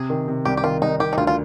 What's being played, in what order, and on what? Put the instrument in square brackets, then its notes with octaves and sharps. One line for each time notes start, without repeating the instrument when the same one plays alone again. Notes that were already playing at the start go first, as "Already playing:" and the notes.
Already playing: [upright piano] C3 [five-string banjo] G#4
[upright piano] D#3
C3
[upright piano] C2 [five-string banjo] G4
[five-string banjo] G4
[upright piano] D#3 [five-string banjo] F4
[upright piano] C2 [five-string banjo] D#4
[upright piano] D#3 [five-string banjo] G4
[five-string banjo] D#4
[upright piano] D2 [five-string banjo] F4
[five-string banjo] F4